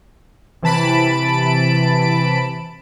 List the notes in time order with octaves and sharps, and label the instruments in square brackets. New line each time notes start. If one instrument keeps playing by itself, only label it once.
[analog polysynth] C3 E3 A5 B5 D7